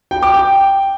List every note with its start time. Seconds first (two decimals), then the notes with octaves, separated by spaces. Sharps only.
0.11 G5
0.23 D6
0.34 G5